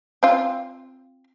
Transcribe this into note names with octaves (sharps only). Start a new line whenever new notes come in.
C4 F4